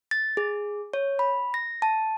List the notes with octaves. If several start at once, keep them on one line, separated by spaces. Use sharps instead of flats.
A6
G#4
C#5
B5
A#6
A5